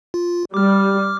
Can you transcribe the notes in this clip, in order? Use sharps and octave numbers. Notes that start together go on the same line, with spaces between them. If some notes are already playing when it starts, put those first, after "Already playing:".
F4
G3 D6 F6